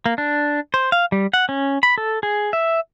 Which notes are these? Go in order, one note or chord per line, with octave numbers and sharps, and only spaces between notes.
A#3
D4
C5
F5
G3
F#5
C#4
B5
A4
G#4
E5